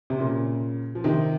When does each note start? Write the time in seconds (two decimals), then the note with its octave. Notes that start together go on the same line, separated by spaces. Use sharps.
0.10 C3
0.19 A#2 C#3
0.95 F3
1.04 C3 D#3